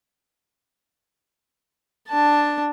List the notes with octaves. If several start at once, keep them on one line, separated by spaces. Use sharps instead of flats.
D4 A5